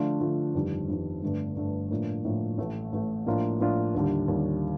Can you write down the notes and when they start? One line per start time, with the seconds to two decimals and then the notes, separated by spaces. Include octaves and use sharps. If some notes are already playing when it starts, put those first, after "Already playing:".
Already playing: D3 F3 A3 D4 F4
0.20 D3 F3 A3 D4 F4
0.54 G1 F2 D#3 G3
0.88 G1 F2 D#3 G3
1.22 G1 G2 D3 A3 D4
1.56 G1 G2 D3 A3 D4
1.91 A2 F3 A#3 D4
2.25 A2 F3 A#3 D4
2.58 A1 A2 A3
2.92 A1 A2 A3
3.27 A2 F3 A#3 D4 F4
3.60 A2 F3 A#3 D4 F4
3.94 D#2 D3 G3
4.28 D#2 D3 G3